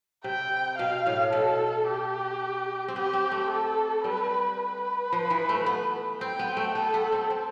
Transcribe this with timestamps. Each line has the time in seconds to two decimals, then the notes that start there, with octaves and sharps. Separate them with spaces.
0.24 C3 G5
0.78 B2 F5
1.06 A2
1.33 B2 A4
1.87 G4
2.88 C4
2.96 B3 G4
3.13 C4
3.31 A3
3.50 A4
4.04 G3 B4
4.58 B4
5.12 F3
5.30 E3
5.49 A3
5.66 B3
6.21 C4 G5
6.39 B3
6.57 A3
6.75 B3 A4
6.94 B3
7.12 C4
7.30 C4